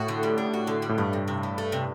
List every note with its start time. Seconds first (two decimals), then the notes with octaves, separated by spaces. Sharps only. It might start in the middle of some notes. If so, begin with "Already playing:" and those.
Already playing: A2 F#4
0.08 D3
0.23 G3
0.38 D4
0.54 F#4
0.67 D3
0.82 G3
0.89 A2
0.98 G2 A3
1.13 C3
1.28 C3
1.43 E3
1.58 A3
1.72 C3